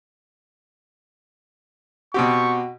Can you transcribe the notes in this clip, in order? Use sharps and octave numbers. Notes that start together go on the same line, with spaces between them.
B2 C4 F#4 G4 C#6